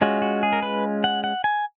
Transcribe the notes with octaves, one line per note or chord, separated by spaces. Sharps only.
G#3 C#4 F4 F#4
F#4
G#4
A#4
B4
F#5
F#5
G#5